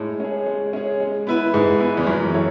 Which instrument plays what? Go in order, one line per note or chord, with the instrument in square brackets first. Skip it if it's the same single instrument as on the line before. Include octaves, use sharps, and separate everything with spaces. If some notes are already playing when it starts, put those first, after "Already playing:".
Already playing: [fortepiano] A2 [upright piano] G#3
[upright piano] C#4 G#4
G#3
C#4 G#4
G#3
B3 E4 B4
[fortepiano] G#2 [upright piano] G#3
[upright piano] B3 E4 B4
[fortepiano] E2
[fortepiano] F#2 [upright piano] E3
[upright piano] B3 E4 A4 C#5